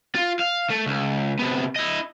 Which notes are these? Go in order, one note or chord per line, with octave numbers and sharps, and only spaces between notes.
F4
F5
A3
C#2
C3 B3
E4 D#5